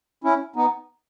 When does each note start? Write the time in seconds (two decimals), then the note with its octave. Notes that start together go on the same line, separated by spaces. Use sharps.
0.24 C#4 E4
0.56 B3 D#4